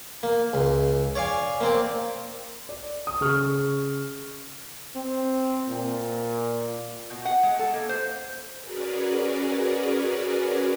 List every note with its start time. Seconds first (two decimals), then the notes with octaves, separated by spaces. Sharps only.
0.23 A#3
0.53 C#2
1.15 C#5 D5 F5 G#5
1.61 A#3 C4 D5
2.69 D5
3.07 D#6
3.21 C#3 G#4 C#6 F6
4.96 C4
5.69 A#2
7.10 B2
7.25 F#5
7.43 G#3
7.59 A4
7.74 A#3
7.89 C5
8.60 C#4 F#4 G#4 A#4 B4 D5